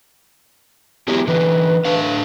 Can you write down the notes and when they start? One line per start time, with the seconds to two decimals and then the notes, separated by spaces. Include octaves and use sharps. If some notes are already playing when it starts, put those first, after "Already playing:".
1.08 F#3 B3 E4 G4
1.28 D3 E3 B4
1.85 A3 D4 F5